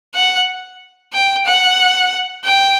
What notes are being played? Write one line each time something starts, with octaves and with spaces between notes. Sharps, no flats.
F#5
G5
F#5
G5